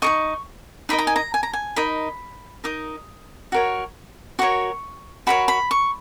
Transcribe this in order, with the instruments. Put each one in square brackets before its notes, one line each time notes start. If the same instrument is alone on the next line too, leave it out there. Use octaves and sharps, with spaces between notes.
[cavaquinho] D#4 A#4 D#5 C#6
D#4 A#4 D#5 B5
A#5
G#5
A#5
G#5
A#5
G#5
D#4 A#4 D#5 B5
D#4 A#4 D#5 D#6
F#4 A#4 C#5
F#4 A#4 C#5 C#6
F#4 A#4 C#5 B5
B5
C#6